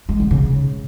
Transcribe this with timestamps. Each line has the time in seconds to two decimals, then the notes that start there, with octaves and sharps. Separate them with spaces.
0.09 G#3
0.20 D3
0.31 C#3